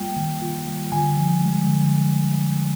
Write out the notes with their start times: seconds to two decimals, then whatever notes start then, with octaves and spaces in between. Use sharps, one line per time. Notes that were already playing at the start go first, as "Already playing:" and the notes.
Already playing: G3 A#3 F4 G5
0.17 D#3
0.42 F4
0.67 G3
0.92 D3 G#5
1.17 F3
1.41 G#3
1.67 D3
1.92 D3